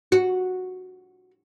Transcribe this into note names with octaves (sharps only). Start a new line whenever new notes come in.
F#4